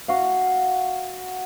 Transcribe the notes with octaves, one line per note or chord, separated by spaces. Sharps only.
F#4 F5